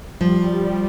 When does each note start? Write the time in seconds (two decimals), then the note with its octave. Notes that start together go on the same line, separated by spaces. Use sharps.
0.21 F3 G3